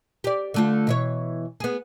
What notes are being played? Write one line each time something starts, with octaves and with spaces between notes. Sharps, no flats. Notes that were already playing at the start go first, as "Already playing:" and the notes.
G4 D5
D3 A3 F4
B2 E3 C#5
B3 G#4